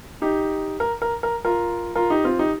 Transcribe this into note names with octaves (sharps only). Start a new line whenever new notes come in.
D#4 G4
A#4
A#4
A#4
F4 A#4
F4 A#4
D#4 G4
C4 F4
D#4 G4